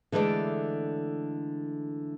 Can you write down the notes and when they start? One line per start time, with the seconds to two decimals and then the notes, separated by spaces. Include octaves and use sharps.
0.12 D3 E3 G#3 A3 D5